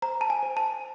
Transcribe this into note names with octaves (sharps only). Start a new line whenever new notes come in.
C5 A#5
A5
G#5
C5
A5